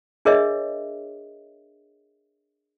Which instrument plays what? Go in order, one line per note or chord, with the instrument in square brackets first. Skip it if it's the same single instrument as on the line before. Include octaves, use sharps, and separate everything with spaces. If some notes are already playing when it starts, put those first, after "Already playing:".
[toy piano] D4 G#4 A#4 C#5 D#5 E5